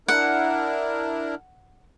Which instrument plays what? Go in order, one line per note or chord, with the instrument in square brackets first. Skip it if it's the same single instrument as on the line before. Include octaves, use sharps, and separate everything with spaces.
[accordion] D4 E4 A#4 [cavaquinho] F#5